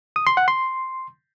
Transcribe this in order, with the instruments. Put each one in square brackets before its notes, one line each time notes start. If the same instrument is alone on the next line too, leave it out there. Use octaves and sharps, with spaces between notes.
[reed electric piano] D#6
C6
F#5
C6